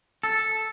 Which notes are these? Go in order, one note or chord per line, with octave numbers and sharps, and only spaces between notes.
A4